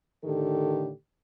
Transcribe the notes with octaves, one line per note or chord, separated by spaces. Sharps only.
A2 D3 D#3 G4 A4